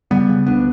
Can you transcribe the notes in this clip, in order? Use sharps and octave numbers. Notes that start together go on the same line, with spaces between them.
C#3 G3 B3
C#3
D2 B3 D4